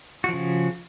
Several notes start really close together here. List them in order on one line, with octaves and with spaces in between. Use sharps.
F#4 F3 C#3